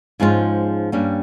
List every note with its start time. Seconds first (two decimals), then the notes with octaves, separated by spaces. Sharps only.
0.20 G#2 F3 G#3 C#4 F4
0.92 G2 G3 A#3 C#4